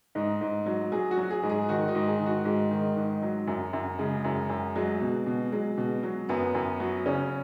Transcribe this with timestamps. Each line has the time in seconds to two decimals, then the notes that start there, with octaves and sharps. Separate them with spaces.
0.15 G#2 D#4
0.41 G#2
0.66 F#3
0.92 F#3 G#4
1.11 F#4
1.17 F#3
1.31 G#4
1.43 G#2
1.50 G#4
1.69 D#3 F#4
1.88 D#4
1.95 G#2
2.07 G#4
2.20 D#3
2.26 F#4
2.45 G#2 G#3
2.71 D#3
2.97 G#2
3.22 F#3
3.47 F#2
3.73 F#2
3.99 C#3 G#3
4.25 F#2
4.49 F#2
4.76 F#3 G#3
5.01 B2
5.27 B2
5.52 F#3 G#3
5.78 B2
6.03 F#3
6.29 F#2 B3
6.55 F#2
6.80 F#3
7.06 C#3 C#4